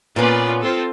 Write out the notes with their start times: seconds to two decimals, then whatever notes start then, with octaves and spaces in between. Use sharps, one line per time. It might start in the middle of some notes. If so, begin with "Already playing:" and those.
0.16 A#2 B3 C#4 F4 B4 D5
0.61 C4 F4 A4